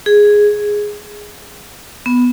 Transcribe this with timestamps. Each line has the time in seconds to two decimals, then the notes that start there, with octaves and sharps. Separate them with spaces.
0.06 G#4
2.06 B3